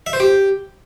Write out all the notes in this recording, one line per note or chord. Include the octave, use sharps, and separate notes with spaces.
E5
C5
G4